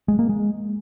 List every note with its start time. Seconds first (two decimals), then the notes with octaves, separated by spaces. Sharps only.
0.08 G#3
0.19 A#3
0.29 G#3